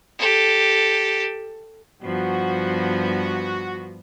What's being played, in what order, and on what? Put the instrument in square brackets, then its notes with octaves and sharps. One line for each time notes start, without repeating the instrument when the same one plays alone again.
[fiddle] G4 A4
[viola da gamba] G2 F3 B3 [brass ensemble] F#4